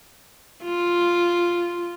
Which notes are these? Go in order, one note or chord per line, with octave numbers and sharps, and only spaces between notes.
F4